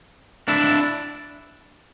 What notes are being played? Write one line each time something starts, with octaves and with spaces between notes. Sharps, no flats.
D4 E4